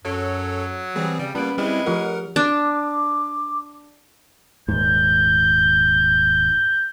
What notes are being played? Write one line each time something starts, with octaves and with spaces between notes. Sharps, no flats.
F#2 F#3 A4 C#5
E3 G3 C4 G#4
C#3 G3
G3 A#3 B3 C#4 B4 D7
G3 G#3 C4 E4
F3 F4 G4 A#4 F#5
D4 D6
D#1 G#2 G6